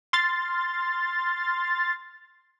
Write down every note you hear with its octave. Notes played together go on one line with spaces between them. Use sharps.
C6 F6 A6